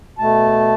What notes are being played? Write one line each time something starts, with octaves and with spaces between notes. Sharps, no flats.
B2 A3 A5